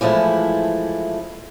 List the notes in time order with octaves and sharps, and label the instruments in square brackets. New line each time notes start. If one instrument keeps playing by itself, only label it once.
[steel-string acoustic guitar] E3 F3 G#3 A3 E4